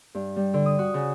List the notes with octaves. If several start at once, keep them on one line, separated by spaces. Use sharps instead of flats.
G2
G3
D3
D#6
F#4
C#3